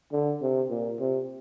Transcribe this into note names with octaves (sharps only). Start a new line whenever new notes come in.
D3
C3
A#2
C3